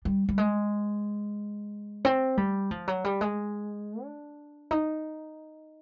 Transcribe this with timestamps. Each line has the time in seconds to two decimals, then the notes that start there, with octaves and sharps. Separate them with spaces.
0.05 G3
0.29 G3
0.38 G#3
2.05 C4
2.37 G3
2.71 F3
2.88 F#3
3.04 G3
3.21 G#3
4.03 D4
4.71 D#4